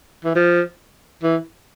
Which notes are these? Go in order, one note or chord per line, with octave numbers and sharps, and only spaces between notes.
E3
F3
E3